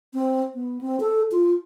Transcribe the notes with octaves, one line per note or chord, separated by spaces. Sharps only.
C4
B3
C4
A4
F4